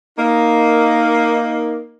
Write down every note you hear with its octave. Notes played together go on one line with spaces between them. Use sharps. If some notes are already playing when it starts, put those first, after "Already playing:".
A#3 D#4